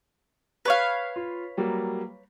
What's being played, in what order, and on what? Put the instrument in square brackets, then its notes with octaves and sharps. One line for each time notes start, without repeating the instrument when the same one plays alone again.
[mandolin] B4 C#5 F5
[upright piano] F4
F#3 G3 A#3